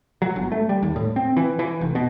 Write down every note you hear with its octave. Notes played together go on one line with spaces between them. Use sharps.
F#3
G1
A3
G3
D#2
A2
C4
E3
E3
F1
B2